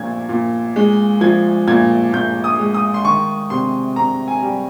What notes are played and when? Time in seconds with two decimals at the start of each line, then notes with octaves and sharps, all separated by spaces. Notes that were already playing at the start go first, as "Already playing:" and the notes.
Already playing: A#2 F3 G#6
0.29 A#2
0.76 G#3
1.21 F3 G#6
1.68 A#2 G#6
2.13 A#2 G6
2.44 D#6
2.59 G#3
2.74 D#6
2.94 C6
3.05 D#3 C#6
3.50 C3 C6
3.96 C3 A#5
4.28 G#5
4.42 G3